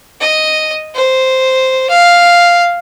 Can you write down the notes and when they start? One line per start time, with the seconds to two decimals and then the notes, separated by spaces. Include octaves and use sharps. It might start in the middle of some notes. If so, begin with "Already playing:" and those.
0.21 D#5
0.95 C5
1.90 F5